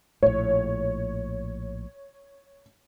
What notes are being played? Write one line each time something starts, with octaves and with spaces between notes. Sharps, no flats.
A#1 A2 C#5